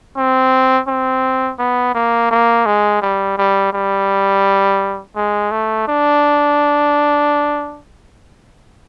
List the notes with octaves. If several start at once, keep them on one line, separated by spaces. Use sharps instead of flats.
C4
C4
B3
A#3
A#3
G#3
G3
G3
G3
G#3
A3
D4